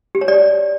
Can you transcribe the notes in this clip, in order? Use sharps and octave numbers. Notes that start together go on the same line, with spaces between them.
G4
C#5
D5